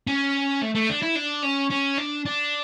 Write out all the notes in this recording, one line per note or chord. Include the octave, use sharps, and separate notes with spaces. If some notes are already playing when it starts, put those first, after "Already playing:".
C#4
A3
A3
D4
E4
D4
C#4
C#4
D4
D4